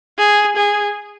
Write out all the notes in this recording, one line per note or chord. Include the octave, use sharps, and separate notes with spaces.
G#4
G#4